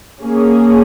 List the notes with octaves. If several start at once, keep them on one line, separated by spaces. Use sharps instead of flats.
A#3 C#4 G#4